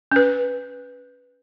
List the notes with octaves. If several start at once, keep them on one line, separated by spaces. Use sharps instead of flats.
C#4 B4